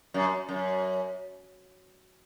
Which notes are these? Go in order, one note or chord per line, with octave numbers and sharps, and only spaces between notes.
F#2
F#2